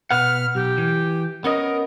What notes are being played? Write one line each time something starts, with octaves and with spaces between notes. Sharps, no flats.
B2 B4 F#5 F6
B1 G4
E3
B3 C#4 A#4 D#5